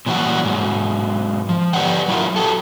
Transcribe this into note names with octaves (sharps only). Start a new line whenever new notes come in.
A#2 E3 F#3 G3 F#4
G#2 F#3
F3
G4 B4 C#5 D5 F#5 G5
F#3 E4 F4 A#4
F#4 G4 A4